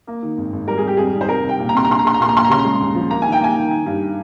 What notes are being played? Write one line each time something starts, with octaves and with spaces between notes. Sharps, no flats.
A#3
D#3
G#1
G#1
G3 A#4
G#4
G3 G4
F2 G#4
D#3
C5
C2 A#4
C2
G5
A#2
A#5
C2 C6
A#5
A#1 C6
A#5
A#1 C6
A#5
A#2 C6
A#5
A#2 C6
A#5
C#3 C6
A#5
G#3
D#2
F3
A#3 A#5
D#3 G#5
G5
A#3 G#5
D#3
D#3
G2